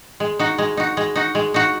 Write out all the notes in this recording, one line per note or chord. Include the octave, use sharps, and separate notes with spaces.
G#3
D#4 F#4
G#3
D#4 F#4
G#3
D#4 F#4
G#3
D#4 F#4